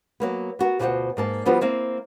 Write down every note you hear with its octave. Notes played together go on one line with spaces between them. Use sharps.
F#3 A#3 B3
B3 F#4 A#4
D2 B2 F4 G4 C5 F#5
G#2 A#3 A5
F3 G3 B3 D4 F4 F#4
A#3 C4 E4